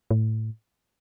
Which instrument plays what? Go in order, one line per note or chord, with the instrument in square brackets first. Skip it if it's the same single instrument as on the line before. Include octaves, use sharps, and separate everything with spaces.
[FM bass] A2